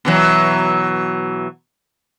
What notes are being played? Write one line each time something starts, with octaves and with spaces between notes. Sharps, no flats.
B2 E3 F#3